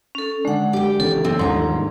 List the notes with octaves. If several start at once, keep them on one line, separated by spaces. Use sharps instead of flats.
C#4 A4
D3 G#3 D4 F#5
G4 G5
C#3 E3 C#4 A4
C4
D#2 G#2 F3 G3 D4 A#5 C6